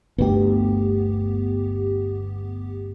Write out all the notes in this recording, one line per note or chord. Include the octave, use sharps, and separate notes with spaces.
G1 D2 B3 G4